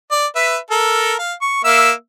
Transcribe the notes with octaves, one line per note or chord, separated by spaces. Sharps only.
D5
B4 E5
A4 A#4
F5
C#6
A#3 E5 E6